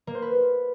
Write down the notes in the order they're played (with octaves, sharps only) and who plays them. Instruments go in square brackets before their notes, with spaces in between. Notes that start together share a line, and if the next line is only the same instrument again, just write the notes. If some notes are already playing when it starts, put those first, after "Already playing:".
[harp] A#3
C5
B4